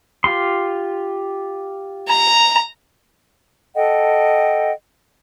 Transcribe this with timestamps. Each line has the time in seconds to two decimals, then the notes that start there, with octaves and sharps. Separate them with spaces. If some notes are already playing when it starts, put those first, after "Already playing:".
0.24 F4 G4 C6
2.08 A#5
3.75 A4 D#5 F#5 G5